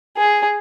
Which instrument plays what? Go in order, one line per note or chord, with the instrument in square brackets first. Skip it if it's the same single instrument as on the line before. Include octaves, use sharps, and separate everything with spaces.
[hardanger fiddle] G#4